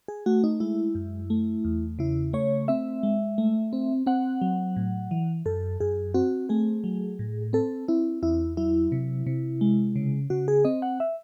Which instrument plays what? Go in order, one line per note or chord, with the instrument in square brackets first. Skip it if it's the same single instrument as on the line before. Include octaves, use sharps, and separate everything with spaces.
[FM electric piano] G#4
A3 F#4
D#4
G#3 E4
F#2
A3
E2
C#3 E4
A3 C#5
C4 E5
G#3
A3
C4
C4 F#5
F#3
A2
E3
F#2 A4
F#2 G#4
C4 F#4
A3 G#4
F#3
A2
C4 A4
C4 E4
E2 E4
F#3 E4
C3
C3
G#3
C#3
C#3 F#4
G#4
C4 D#5
F#5
E5